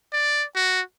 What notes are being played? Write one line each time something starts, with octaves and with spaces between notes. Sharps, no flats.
D5
F#4